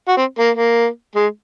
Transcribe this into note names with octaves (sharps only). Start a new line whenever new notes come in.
F#4
C4
A#3
A#3
G#3